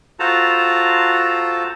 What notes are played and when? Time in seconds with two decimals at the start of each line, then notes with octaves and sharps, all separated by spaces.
0.20 F4 F#4 A4 C5 A5 A#5